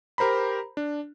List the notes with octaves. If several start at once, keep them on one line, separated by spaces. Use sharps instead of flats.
G4 A#4 C5 A#5 B5
D4